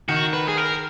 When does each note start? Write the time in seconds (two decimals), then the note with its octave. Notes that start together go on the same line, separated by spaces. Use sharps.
0.09 D#3 F#4
0.33 B4
0.48 G#4
0.57 A#4